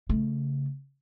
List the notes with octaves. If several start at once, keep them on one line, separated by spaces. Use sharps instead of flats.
C#3 A3